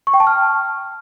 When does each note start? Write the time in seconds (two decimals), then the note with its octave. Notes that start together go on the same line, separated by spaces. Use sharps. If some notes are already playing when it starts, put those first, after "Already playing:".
0.07 C#6
0.14 G5
0.20 A5
0.27 F6